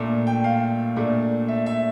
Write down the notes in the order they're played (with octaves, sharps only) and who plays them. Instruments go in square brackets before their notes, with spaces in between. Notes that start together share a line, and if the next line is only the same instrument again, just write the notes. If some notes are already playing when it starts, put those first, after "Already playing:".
Already playing: [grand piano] A#2 A3 D4
G5
F5
A#2 A3 D4
E5
E5